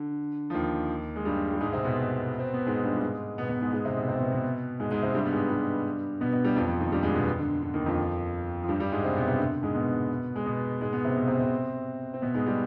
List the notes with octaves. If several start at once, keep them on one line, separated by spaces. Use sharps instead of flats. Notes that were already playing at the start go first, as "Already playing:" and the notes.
Already playing: D3
F3
D#2 D#3
G#3
G2 G3
G3
G#2 G#3
C3 C4
B2 B3
C4
B3
G#2 G#3
G2 G3
G3
G#2 G#3
B2 B3
B2 B3
G#2 G#3
G#2 G#3
C3 C4
B2 B3
C3 C4
B2 B3
B2 B3
G#2 G#3
G#2 G#3
C3 C4
G2 G3
B3
G#2 G#3
G2 G3
B2 B3
B2 B3
G2 G3
F2 F3
F2 F3
D#2 D#3
G2 G3
G#2 G#3
B2 B3
D3
D3
D#2 D#3
F2 F3
F3
G2 G3
G2 G3
G#2 G#3
C3 C4
B2 B3
C3
D3
G#2 G#3
B2 B3
G#3
B2 B3
G#2 G#3
B2 B3
C3 C4
B2 B3
C3 C4
C3 C4
C4
B2 B3
G#2 G#3
G3